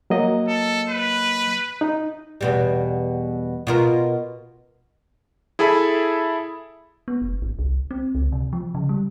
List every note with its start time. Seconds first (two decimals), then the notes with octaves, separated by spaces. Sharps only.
0.10 F#3 A#3 D#5
0.48 A4
0.89 B4
1.81 D#4
2.41 E2 B2 G3
3.67 B2 F4 A#4
5.59 E4 G#4 A4 E5 B5
7.08 B3
7.22 F#1
7.42 G#1
7.59 C2
7.91 C4
8.15 C#2
8.32 C3
8.53 F3
8.75 C#3
8.89 G3